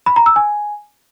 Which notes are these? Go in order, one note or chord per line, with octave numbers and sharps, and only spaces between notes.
B5
A#5
E6
G#5